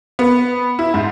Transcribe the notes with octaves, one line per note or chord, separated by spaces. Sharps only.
B3
E4
G#2